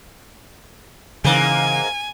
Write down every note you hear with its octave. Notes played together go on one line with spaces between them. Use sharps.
G#2 C#3 E3 A#3 G#5